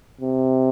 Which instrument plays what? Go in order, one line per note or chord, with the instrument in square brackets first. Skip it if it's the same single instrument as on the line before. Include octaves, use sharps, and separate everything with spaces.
[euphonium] C3